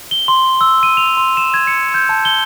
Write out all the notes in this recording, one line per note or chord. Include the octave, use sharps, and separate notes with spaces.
G7
C6
E6
D#7
F7
C6
E7
G#6
C#7
G6
A5
G7